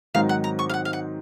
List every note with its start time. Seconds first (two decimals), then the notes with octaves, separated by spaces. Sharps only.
0.14 G#2 D#3 F#3 C4 D#4 F5
0.29 F#5
0.44 A#5
0.59 C#6
0.69 F5
0.74 F#5
0.85 F5
0.93 F#5